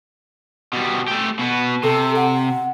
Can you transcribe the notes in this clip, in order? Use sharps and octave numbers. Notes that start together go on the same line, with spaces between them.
B2 G3
A3 G4
B2 B3
C3 A4
F#5